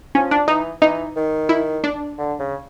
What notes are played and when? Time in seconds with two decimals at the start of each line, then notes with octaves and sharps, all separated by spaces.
0.15 F3 C#4
0.31 D4
0.48 E3 D#4
0.82 E3 D#4
1.17 D#3
1.49 E4
1.84 D4
2.18 D3
2.39 C#3